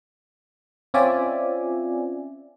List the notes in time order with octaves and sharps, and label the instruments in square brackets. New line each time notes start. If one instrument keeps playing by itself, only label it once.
[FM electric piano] C4 C#4 F4 D5 E5 G#5